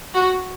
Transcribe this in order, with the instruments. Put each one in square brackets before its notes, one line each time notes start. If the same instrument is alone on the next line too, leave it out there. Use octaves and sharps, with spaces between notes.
[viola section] F#4